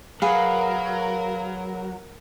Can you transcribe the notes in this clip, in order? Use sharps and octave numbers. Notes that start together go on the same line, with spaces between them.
F#3 G#4 A#4 B4 F5 F#5